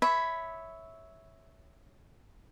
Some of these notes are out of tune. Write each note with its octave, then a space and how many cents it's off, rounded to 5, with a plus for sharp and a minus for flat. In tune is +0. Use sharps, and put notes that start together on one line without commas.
C#5 +0 E5 -10 B5 +10